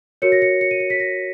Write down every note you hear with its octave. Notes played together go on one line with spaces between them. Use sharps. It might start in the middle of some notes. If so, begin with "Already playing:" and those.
F#4 A#4 C#5 C#7
A#6
C#7
C#7
D#7
C#7
B6
A#6